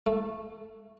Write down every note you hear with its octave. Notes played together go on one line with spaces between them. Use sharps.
A3